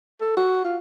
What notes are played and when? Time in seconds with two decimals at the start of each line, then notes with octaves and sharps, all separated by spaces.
0.21 A4
0.37 F#4
0.65 F4